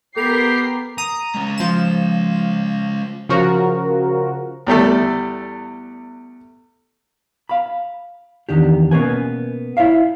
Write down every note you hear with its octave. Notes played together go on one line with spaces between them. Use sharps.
B3 G4 A4 A#4 A#5 C7 F7
A#5 D#6
G#3 C#4
F3 E7
C#3 F3 F#4 A#4
E2 G3 A3 A4
F5 B5
E2 D#3 D4 G4
B2 A#3 B3 C#4 B4 G#5
E4 C#5 E5 F5